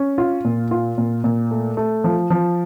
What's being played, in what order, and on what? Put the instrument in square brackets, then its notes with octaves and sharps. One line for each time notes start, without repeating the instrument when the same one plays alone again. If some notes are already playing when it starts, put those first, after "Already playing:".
Already playing: [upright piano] C#4
F4
A#2
F4
A#2
A#2
A3
A3
F3
F3